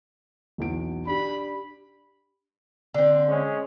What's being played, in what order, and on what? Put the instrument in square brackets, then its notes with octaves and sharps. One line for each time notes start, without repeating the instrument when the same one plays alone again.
[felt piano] B1 E2 D7
[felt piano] D4 G4 [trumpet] B5
[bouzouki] D3 C4
[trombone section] G#3 C#4